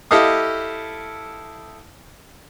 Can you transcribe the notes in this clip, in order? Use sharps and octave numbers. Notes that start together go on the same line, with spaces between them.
E4 G4 A4 D#5 F5 D#6